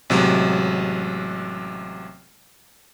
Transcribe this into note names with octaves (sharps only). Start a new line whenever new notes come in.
A1 C3 F#3 G#3